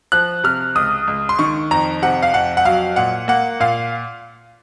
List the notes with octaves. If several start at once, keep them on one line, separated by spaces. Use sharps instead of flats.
F3 F#6
C3 F6
C#2 D#6
C#2
C6
D#3 C#6
F2 A#5
C3 F#5
F5
F2 F#5
F#5
F#3 F5
A#2 F#5
A#3 F#5
A#2 F5